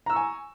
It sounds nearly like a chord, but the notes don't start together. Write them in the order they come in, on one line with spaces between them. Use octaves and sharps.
A#5 E6 C#6 G#5